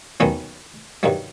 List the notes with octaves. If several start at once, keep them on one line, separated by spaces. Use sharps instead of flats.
D#2 D#3 F#3 B3 C#4
G2 D#3 F#3